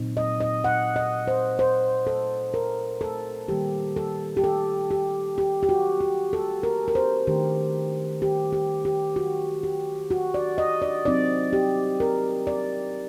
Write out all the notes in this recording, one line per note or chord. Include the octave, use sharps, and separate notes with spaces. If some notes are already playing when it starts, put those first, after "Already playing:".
Already playing: A#2 F#3 C4 D#4
D#5
D#5
F#5
D#5
C5
C5
A4
A#4
A4
D#3 G3 A#3 G4
A4
G4
A4
G4
G4
G4
F#4
G4
A4
A#4
A#4
C5
D#3 A3 D4 G4
G4
G4
G4
F#4
G4
F#4
D5
D#5
D5
F#3 C4 D#4 D5
G4
A#4
D5